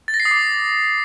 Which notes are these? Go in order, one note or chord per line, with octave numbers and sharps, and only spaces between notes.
A6
A#6
C7
D#6
D6